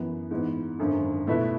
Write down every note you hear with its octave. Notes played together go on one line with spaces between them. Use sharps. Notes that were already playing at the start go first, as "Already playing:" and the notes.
Already playing: F#2 E3 B3
G#2 E3 B3
G#1 F#2 D3
B2 A3 E4 B4 E5